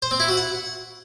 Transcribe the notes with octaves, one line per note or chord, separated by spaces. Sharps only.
C5
C4
E4
F#4
F#5